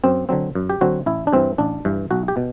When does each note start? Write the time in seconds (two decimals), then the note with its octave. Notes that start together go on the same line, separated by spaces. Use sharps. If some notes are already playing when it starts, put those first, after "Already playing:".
0.04 F#2 C4
0.29 D3 F#3 C4
0.55 F#2
0.70 G4
0.81 D3 F#3 C4 F#4
1.06 A1 E4
1.27 D4
1.33 G2 E3 C4
1.58 A1 D4
1.85 G2 E3
2.11 B1 F#4
2.28 G4
2.37 B2